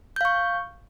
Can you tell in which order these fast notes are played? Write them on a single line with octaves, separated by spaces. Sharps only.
G6 F5 C#6